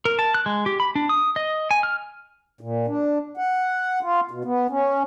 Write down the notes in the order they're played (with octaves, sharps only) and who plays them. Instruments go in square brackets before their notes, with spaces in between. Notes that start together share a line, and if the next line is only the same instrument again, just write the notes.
[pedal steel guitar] A#4
A5
F#6
G#3
G4
B5
D4
D#6
D#5
G#5
F6
[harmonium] A#2
D4
F#5
F4
B2
B3
C#4